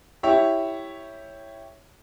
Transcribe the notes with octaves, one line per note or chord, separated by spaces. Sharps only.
E4 G4 C#5 E5